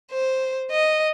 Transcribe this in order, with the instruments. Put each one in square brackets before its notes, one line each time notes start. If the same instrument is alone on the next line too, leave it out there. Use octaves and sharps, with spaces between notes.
[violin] C5
D#5